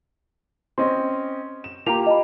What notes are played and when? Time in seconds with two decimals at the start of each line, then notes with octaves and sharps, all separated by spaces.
0.78 C4 C#4 D#5 C6
1.64 E7
1.86 A#3 F4 G4 A#5 F7
2.06 D#5 A5 B5